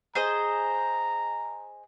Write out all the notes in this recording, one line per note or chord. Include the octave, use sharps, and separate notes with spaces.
G#4 C5 D#5 A#5